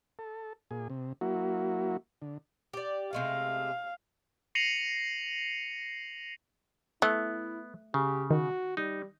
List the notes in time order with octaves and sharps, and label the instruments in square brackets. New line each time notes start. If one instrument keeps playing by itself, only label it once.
[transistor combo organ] A4
A#2 G#4
C3
F#3 A#3 E4 F#4
D3
[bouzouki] G4 D5
[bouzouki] C3 G#3 A3 [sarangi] F5
[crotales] A#6 C7 C#7 D#7 F7 F#7
[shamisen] A3 [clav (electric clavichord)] B3 [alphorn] E4
[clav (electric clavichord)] C#3 [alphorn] G4
[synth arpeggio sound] D#3 [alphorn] F#4
[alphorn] G3 [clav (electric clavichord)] D#4